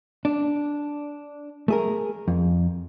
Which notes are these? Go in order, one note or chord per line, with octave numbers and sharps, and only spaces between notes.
D4
A3 G#4 A#4
F2